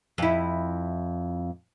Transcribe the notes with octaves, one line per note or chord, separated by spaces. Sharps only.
F2 E4